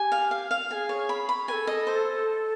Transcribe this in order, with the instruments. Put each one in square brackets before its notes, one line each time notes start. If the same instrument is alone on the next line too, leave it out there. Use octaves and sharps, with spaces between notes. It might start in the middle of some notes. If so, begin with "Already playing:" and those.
Already playing: [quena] G4 [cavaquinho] G#5
[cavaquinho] F5
F5
F5
[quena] G#4 A4 [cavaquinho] G#5
[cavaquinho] C#5
B5
B5
[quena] A4 B4 [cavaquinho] G#5
[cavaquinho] D#5
C5